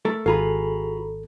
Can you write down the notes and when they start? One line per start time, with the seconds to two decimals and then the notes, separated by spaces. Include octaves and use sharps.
0.05 A3 A4 A#4
0.26 G#1 F4 F#4 G#4 A4 B4 A#5 B5